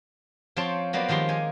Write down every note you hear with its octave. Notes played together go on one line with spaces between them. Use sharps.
F3 C4 C#5 G5 A5 C6
F#3 A#3 B3 C5 D5
D#3 F3 G#3 G4 C6
D#4 G#5